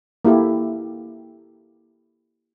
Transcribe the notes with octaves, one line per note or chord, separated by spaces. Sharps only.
A#3 E4 G4 A4